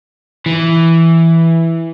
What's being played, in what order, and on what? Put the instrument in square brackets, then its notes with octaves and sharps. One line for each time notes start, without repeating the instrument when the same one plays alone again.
[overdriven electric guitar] E3